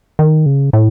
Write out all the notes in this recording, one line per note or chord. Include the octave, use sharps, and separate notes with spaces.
D#3
C#3
A2